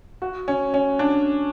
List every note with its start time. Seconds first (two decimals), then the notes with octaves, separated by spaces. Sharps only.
0.22 F#4
0.48 C#4
0.74 C#4
0.99 D4